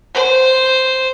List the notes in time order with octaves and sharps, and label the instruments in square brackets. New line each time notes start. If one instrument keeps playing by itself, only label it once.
[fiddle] C5